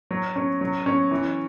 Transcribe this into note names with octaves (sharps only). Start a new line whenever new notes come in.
F#3
C#4
F#3
C#4
E3